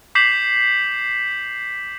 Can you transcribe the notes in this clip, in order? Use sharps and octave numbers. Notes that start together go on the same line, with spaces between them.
D6 G6 B6 C7 E7 F#7